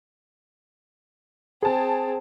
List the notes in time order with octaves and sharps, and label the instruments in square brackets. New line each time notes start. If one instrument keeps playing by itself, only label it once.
[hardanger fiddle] C4 [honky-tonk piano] G#4 A5